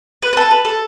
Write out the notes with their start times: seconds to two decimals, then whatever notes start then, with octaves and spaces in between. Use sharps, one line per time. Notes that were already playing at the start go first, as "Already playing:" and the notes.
0.22 B4
0.33 B4
0.37 A4
0.51 B4
0.65 A4